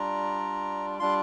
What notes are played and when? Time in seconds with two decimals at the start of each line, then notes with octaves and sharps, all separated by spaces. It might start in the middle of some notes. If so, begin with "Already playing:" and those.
Already playing: G3 D4 F4 A#5
0.99 G3 D4 F4 C6